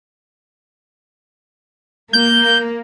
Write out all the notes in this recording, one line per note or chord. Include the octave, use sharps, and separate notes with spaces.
A#3 G6